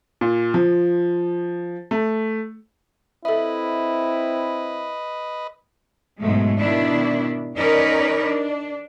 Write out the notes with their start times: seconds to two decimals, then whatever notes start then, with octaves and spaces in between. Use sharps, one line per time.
0.21 A#2
0.54 F3
1.91 A3
3.25 C4 E4 A4 B4 D#5 E5
6.20 G#2 B2 F#3 G#3 A3
6.59 B2 D#3 D4 E4
7.56 C#4 D#4 A#4 B4 C#5 D5
8.22 D4